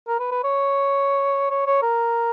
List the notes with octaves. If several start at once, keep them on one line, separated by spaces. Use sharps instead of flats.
A#4
B4
B4
C#5
C#5
C#5
A#4